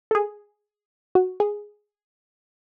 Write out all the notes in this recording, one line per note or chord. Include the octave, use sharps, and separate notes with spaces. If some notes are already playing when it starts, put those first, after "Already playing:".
A4
G#4
F#4
G#4